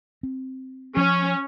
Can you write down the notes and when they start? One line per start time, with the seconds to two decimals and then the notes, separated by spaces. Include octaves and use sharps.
0.23 C4
0.97 F3 C#4